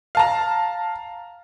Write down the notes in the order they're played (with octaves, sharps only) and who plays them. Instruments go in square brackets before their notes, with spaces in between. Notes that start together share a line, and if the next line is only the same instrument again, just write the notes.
[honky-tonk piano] F5 A5 A#5